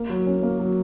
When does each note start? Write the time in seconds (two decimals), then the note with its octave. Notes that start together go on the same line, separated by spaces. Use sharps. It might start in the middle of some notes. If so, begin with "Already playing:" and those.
Already playing: A#3
0.10 F#3
0.27 C#4
0.43 A#3
0.59 F#3